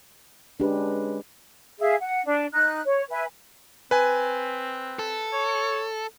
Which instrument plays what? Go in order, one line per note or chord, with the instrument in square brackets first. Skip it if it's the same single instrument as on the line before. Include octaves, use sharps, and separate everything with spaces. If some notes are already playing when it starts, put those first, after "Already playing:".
[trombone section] G#3 C#4 B4 [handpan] D4 G4
[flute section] G#4 E5 F5
F#5
D4
D#4 F#6
C#5
B4 E5 G#5
[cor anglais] C4 [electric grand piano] B4 G#5
[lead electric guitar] A4
[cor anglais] C#5